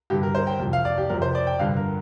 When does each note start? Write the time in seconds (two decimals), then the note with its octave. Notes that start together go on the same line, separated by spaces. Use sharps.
0.10 G2 D3 G4
0.23 A#4
0.35 C5
0.47 G5
0.60 F2 C3
0.73 F5
0.85 D5
0.98 G4
1.09 F2 C3 A#4
1.22 C5
1.35 D5
1.47 G5
1.59 G2 D3 F5
1.77 A#4